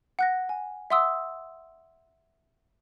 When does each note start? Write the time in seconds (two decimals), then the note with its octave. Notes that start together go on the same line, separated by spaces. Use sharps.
0.19 F#5 F#6 A#6
0.49 G#5
0.90 E5 F#5 C6 D#6 E6